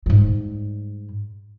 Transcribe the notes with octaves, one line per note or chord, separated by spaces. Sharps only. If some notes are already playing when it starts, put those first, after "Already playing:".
G#2 G3